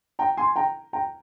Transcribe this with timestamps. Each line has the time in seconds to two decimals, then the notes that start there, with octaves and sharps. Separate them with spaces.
0.19 G5 A#5
0.37 G#5 C6
0.56 G5 A#5
0.93 G5 A#5